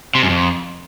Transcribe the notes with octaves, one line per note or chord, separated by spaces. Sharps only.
C3
F#2
F2